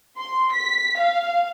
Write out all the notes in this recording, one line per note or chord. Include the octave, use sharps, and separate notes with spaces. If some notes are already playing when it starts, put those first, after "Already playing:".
C6
B6
F5